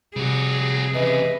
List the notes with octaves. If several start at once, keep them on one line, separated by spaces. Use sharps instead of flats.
C3 G3 F#4 G#4
E2 C#3 B4 D#5 E5